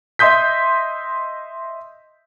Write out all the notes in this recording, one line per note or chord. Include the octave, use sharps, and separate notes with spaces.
D#5 E5 C6 D#6 G6 B6